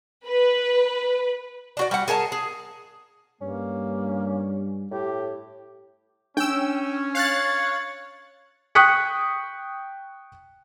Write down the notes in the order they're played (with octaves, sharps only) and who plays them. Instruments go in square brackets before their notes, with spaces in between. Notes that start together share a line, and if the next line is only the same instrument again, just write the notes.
[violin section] B4
[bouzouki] D4 F#4 D5
G3 F#5
G#4 A#4 G#5 A5
G#4
[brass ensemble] G2 [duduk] A#3 [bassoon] C#4
[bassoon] A2 [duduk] G4
[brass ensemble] C#4 [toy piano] D4 [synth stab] G5 E6
[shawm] C#5 [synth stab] F5 F#6 A6
[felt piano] G5 C#6 D#6 F#6 B6 C#7